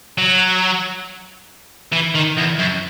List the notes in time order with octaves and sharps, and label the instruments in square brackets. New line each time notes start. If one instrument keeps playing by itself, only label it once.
[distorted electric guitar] F#3
E3
D#3
E2
F#2